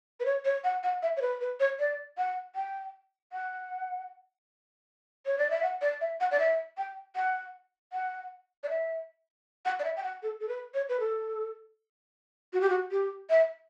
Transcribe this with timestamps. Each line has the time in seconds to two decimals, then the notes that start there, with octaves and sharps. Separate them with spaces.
0.20 B4
0.26 C#5
0.45 C#5
0.64 F#5
0.83 F#5
1.03 E5
1.17 C#5
1.21 B4
1.41 B4
1.60 C#5
1.79 D5
2.18 F#5
2.55 G5
3.33 F#5
5.26 C#5
5.38 D5
5.50 E5
5.63 F#5
5.81 D5
6.01 E5
6.20 F#5
6.31 D5
6.39 E5
6.78 G5
7.16 F#5
7.93 F#5
8.64 D5
8.69 E5
9.65 F#5
9.80 D5
9.84 E5
9.97 G5
10.03 F#5
10.23 A4
10.40 A4
10.48 B4
10.74 C#5
10.89 B4
11.00 A4
12.53 F#4
12.61 G4
12.70 F#4
12.91 G4
13.30 E5